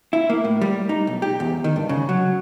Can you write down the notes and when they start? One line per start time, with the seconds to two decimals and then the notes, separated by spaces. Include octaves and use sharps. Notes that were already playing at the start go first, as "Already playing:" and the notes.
0.13 E4
0.30 A#3
0.44 A2
0.61 G3
0.89 D#4
1.07 B1
1.22 G4
1.40 E2
1.64 D#3
1.76 G2
1.89 C#3
2.09 F#3